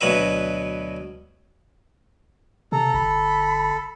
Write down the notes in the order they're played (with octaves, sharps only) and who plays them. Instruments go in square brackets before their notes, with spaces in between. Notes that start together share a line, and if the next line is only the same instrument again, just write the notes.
[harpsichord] D2 B2 F#3 B4 E5
[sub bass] C3 [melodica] A4 [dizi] A#5
[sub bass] G1 [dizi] B5